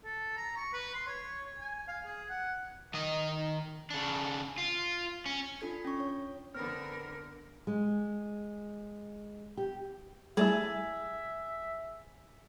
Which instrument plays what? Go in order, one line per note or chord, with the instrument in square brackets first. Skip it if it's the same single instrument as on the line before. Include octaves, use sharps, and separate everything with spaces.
[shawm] A4
A#5
C#6
B4
C6
C#5
G#5
F5
G#4
F#5
[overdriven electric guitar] D#3 D#5
C#3 D4
F4
C#4
[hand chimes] D4 F4 A4 G#6
C#4 C#6
C#5
[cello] D3 A#4 [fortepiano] B3 C4 [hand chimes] F6
[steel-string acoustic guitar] G#3
G4
[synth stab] G3 A3 E4 [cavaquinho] G#4 A5 [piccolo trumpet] E5